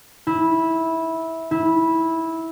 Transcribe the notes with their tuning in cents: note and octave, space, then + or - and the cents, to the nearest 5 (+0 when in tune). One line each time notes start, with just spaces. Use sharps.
E4 -15
E4 -15